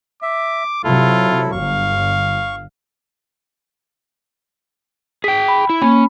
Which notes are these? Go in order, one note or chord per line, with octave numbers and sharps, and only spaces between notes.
E5 D6
C3 F#3 E4 F4 A4
G1 F5 C#6
G#4 G5 B6
B5
E4
A#3 C#4 B5